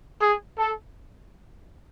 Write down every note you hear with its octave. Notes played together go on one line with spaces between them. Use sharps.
G#4
A4